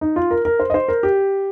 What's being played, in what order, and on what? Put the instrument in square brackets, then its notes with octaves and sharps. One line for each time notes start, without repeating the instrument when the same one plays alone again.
[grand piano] D#4
F4
A#4
A#4
C5
D#5
C5
A#4
G4